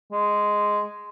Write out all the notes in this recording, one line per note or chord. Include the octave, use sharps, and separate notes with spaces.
G#3